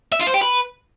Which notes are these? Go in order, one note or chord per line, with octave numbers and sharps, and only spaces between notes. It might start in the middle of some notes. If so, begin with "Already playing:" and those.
E5
F4
C5
G4
B4